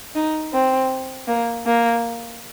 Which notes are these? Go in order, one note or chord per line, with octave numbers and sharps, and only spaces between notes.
D#4
C4
A#3
A#3